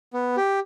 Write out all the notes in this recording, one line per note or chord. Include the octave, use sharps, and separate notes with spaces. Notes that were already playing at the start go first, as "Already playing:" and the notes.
B3
G4